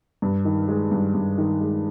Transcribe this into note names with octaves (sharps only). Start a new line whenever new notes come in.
G2
D#3
G#3
G2
G2
D#3
G#3